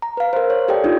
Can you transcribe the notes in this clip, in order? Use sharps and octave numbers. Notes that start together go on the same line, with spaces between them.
A#5
B4 F5
A#4 C5
C#5
G4 A4 D5 G5
D4 D#4 F4